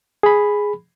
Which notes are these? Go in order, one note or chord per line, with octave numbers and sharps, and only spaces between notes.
G#4 B5